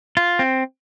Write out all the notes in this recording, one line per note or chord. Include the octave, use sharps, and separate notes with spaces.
F4
C4